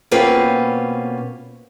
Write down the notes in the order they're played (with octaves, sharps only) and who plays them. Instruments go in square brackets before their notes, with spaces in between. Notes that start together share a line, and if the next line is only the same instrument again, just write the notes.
[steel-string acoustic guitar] B2 A#3 C4 C#4 F4 B4